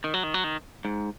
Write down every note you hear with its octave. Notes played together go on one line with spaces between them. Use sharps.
D#3
F#3
D#3
F#3
D#3
G#2